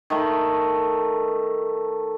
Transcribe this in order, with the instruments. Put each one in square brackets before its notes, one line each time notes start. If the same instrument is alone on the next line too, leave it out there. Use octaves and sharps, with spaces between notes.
[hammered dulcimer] D#3 A3 B5